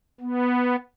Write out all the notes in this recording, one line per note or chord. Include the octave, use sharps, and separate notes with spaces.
B3